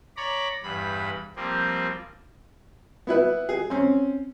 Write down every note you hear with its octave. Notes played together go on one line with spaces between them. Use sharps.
C#5 D5 A#5 B5
E2 G2 B5
F3 G3 A#3 C4
B3 E4 B4
G#4
C4 C#4